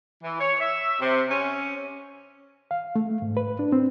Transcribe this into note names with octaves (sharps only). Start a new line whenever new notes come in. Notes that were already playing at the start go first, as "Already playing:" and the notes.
E3
C#5
E5
C3
C#4
F5
A3
G#2
B4
D4
C4